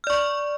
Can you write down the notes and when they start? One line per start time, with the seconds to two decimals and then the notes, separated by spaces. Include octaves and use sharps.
0.04 F6
0.07 D5
0.10 C#6